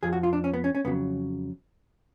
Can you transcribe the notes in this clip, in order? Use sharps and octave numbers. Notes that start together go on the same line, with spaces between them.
F2 F3 G#4
F#4
F4
D4
C#4
B3
C#4
C#4
F2 C#3 F#3 B3